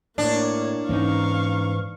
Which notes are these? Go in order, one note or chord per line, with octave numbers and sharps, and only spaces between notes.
A2 A#3 D4 C#5
G#2 E3 A#3 C#4 D#4 F5 C#6